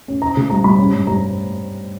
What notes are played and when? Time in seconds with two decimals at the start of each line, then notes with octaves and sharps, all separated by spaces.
0.08 C#4
0.22 C#4 A#5
0.37 C#3
0.50 G3 A#5
0.64 G3 B5
0.79 C#4
0.94 G2
1.07 G3 A#5